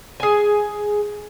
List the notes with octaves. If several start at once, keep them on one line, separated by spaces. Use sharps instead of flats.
G#4 G#5